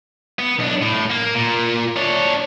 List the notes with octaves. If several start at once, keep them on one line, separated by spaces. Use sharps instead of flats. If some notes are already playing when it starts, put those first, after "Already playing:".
B3
B1 D4
A2
A#3
A#2
D4 C#5